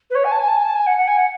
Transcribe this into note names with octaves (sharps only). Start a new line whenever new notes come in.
B4
C#5
G#5
A5
G#5
A5
G#5
A5
G#5
F#5
F#5
G#5
F#5